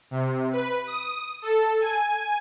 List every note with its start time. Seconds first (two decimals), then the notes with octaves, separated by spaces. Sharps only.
0.11 C3
0.52 B4
0.86 D#6
1.42 A4
1.81 G#5